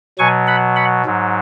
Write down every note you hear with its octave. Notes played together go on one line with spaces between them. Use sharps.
B2 F#3 G#5 C#6
F#5 B5
F#5 B5
G#2 F#3